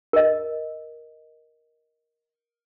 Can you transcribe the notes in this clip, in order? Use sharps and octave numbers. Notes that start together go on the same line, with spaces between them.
A#4 D#5